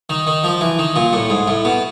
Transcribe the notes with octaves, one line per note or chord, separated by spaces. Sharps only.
D#3
D#3
F3
E3
D#3
A#2
A2
G#2
A2
B2